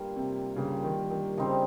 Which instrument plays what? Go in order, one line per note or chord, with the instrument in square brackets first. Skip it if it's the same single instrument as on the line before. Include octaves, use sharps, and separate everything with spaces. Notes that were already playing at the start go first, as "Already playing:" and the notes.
Already playing: [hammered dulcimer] G2 G3 A#3 F4
[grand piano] C3
[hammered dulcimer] G2 G3 A#3 F4 [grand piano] C#3
[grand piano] D#3
D#3
[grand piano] C#3 [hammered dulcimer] G3 C4 D#4